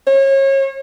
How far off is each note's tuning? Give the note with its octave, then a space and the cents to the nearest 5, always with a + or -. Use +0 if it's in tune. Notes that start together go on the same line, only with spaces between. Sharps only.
C#5 -30